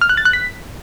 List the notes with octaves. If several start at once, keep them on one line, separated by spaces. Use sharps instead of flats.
F6
F#6
A6
F#6
B6